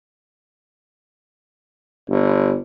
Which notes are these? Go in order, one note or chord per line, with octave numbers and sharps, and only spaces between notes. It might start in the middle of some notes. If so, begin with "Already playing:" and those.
G1